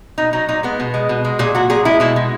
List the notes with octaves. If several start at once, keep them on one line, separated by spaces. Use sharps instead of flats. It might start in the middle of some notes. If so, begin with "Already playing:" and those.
B2 D#4
F#3 D#4
A#2 D#4
G#3 B3
B2
G#3
B2
G#3
A#2 G#4
F#3 F#4
A#2 G#4
G#3 E4
B2 E4
G#3